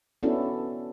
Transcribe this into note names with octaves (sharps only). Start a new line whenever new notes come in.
B3 C#4 D4 E4 F#4 A4